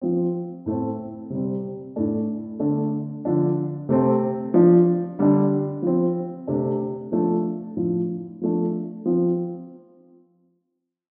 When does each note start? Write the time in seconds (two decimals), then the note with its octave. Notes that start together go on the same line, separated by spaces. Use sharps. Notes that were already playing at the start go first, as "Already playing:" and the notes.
0.01 F3 C4
0.66 A2 A3 C4
1.30 C3 G3 C4
1.96 A2 A3 D4
2.59 D3 A3 D4
3.25 D3 F3 D4
3.89 C3 A3 C4
4.54 F3 D4
5.19 D3 G3 D4
5.82 F3 C4
6.47 C3 A3 D4
7.12 F3 A3 D4
7.76 A2 F3 D4
8.42 F3 A3 D4
9.06 F3 C4